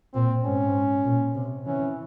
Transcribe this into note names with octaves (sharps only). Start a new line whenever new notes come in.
A#2 C4
G#2 C#4
A#2
C3
E3 C#4